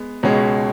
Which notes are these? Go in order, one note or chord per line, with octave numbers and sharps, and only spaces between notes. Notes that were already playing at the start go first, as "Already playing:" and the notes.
Already playing: G#3 B3
C#2 B2 G#3 C#4